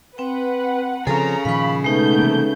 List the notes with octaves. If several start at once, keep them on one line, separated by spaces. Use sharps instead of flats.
C4 B4 F#5 G5
C#3 F3 C4 C#4 G#4 A4 A#5
A#2 D#3 F3 F5 B5 C#6
B2 G#3 A3 B3 D#4 G6
C3 E3 A#3